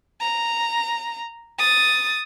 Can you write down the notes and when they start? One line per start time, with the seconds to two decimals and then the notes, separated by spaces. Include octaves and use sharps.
0.21 A#5
1.59 D#6 A6